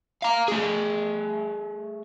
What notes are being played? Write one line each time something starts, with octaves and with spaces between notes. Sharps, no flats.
F5 A#5
A3 G#4